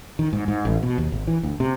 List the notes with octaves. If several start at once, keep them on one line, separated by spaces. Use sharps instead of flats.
D#3
G#2
G#2
A1
B2
D#2
G#1
E3
D2
C3